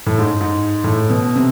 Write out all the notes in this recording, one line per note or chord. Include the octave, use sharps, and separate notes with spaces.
A2
G#2
G#2
A2
B2
C3